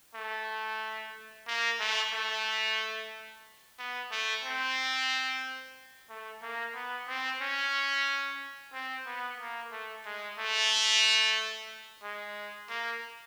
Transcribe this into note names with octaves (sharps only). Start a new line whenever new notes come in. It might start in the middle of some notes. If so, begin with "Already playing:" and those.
A3
A#3
A3
A3
B3
A3
C4
A3
A#3
B3
C4
C#4
C4
B3
A#3
A3
G#3
A3
G#3
A#3